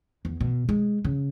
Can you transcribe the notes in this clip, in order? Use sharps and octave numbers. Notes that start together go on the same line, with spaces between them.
E2
B2
G#3
C#3